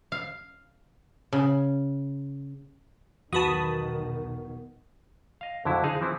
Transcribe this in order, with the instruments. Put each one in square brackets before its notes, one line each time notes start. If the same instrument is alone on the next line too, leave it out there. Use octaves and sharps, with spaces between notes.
[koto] F5
C#3
[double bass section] B1 D#3 [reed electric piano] E2 [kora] B3 F#4 [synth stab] A5 B5 D#6
[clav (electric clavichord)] D#5 F5
F2 D3 F#3 E4
D#4 G#4 C5 F5
E3 F3 C4 E4